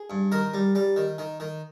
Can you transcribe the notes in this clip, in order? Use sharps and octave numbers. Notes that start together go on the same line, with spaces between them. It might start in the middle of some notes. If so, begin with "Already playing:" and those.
Already playing: G#4
G2
D#3 A#4
G3
G3
D#3
D#3
D#3